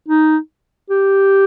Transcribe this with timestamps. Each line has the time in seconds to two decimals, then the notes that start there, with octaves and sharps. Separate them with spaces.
0.08 D#4
0.90 G4